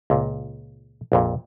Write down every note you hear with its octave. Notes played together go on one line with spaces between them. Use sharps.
C#2 A#2
A#1 F2 A#2